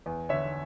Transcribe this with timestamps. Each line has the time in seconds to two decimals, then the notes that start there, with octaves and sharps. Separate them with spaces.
0.06 E2
0.29 D3 C#5 E5